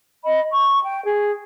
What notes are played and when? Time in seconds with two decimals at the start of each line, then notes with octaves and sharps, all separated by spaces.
0.24 D#5 B5
0.52 C#6
0.84 G5
1.04 G#4